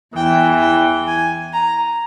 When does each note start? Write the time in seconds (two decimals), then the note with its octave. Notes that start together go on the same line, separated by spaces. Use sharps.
0.16 E2 E3 G5
0.62 G5
1.07 G#5
1.53 A#5